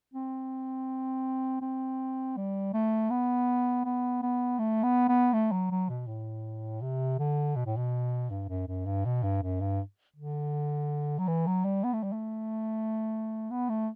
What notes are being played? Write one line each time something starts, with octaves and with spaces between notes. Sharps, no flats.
C4
C4
G3
A3
B3
B3
B3
A3
B3
B3
A3
F#3
F#3
B2
A2
C3
D3
B2
A2
B2
G2
F#2
F#2
G2
B2
G2
F#2
G2
D3
F#3
E3
F#3
G3
B3
A3
G3
A3
B3
A3